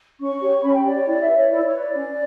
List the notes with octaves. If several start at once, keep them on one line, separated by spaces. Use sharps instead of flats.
C#4 C#6
G4 C#5
C#4 B5
G5
G4 C#5 D5
C#5
E4 D5
E5
B4
C#5
E4 D5
C#5
B4
D5
C#4